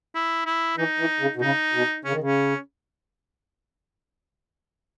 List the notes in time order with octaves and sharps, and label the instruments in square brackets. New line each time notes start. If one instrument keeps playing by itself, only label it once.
[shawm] E4
E4
[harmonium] E3 [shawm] D#4
[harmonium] E3
C#3
B2
[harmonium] C#3 [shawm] D#4
[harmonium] B2
[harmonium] C#3 [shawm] C#4
[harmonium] D#3
[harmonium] C#3 [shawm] C#4